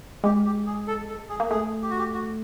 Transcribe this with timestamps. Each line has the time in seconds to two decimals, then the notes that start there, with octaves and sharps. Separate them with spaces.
0.24 G#3 G4
0.45 G4
0.66 G#4
0.87 A4
1.09 A4
1.29 G#4
1.40 A#3
1.51 A3 G#4
1.82 G4
1.90 F#4
1.98 G4
2.14 F#4